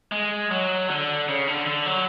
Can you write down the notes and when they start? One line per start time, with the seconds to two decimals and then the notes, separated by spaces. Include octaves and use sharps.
0.12 G#3
0.51 F#3
0.90 D3
1.28 C#3
1.47 D3
1.66 D3
1.86 F#3